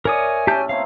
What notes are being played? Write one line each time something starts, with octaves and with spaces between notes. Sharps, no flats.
A#4 C#5 D5 E5 G#5 D#6
A2 A3 C#4 G4 A5 G6
B2 C4 C#5 F5 A#5